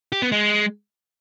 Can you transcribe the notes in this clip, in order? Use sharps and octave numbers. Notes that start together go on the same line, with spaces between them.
G4
B3
G#3